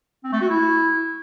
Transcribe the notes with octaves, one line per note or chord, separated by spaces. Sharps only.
C4
A3
F#4
E4